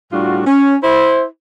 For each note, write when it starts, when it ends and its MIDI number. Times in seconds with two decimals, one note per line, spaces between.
0.12 0.42 45
0.12 0.42 55
0.12 0.42 62
0.12 0.42 65
0.12 0.42 66
0.47 0.76 61
0.83 1.25 64
0.83 1.25 72